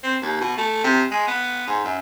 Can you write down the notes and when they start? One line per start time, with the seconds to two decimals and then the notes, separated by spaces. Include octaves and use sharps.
0.04 C4
0.22 D#2
0.41 B2
0.57 A3
0.84 C3
1.11 G#3
1.27 B3
1.67 G#2
1.84 F#2